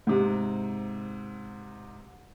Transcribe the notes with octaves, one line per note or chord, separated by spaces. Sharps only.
G#2 C3